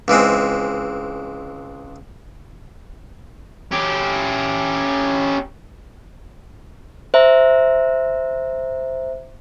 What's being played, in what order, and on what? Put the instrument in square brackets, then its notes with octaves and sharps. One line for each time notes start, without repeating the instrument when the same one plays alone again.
[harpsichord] C#2 E3 G#3 C4
[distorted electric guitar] C#4 G4
[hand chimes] C5 E5 A#5